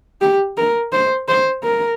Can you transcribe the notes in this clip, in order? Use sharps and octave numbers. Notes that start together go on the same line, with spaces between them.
G4
A#4
C5
C5
A#4